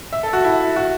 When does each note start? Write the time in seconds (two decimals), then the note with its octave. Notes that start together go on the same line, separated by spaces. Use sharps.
0.13 E5
0.23 A4
0.33 F#4
0.44 E4
0.76 F#4